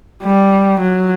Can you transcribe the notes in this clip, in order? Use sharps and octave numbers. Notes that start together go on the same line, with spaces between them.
G3
F#3